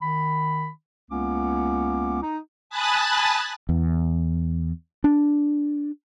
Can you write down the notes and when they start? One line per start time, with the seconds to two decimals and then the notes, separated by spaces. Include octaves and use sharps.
0.01 D#3 B5
1.10 C#2 A#3 B3 C#4 D6
2.22 D#4
2.70 G#5 A5 B5 D#6 F#6 A6
3.69 E2
5.04 D4